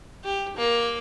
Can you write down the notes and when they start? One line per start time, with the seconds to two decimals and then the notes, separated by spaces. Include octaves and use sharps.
0.24 G4
0.57 A#3